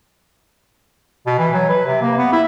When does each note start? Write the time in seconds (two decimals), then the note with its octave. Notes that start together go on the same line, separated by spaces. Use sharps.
1.26 B2
1.38 E3
1.54 F#3
1.69 B4
1.86 C3
2.01 A#3
2.18 B3
2.33 E4